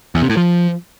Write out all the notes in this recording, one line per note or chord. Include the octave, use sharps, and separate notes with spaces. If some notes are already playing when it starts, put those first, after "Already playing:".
E2
C3
A2
F3